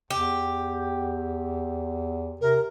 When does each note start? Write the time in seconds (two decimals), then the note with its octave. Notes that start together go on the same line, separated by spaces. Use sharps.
0.10 E2 G4
2.41 C3 A#4